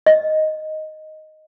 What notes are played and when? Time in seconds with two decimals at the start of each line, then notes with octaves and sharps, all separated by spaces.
0.06 D#5